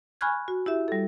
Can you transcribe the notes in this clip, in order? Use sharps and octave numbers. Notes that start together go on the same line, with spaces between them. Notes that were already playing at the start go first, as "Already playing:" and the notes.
G#5 B5 C#6 F6 F#6 G#6
F#4
E4 G4 E5
G3 A4